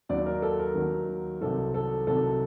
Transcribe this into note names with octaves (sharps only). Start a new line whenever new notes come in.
D#2 D#3 F#3 D5
A#4
A4
A#4
D#2 D#3 F#3
C2 C3 D#3 F#3 A4
A4
C2 C3 D#3 F#3 A4